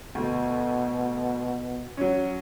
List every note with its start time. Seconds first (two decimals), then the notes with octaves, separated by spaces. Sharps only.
0.15 D2 B2
1.97 F#3 C#4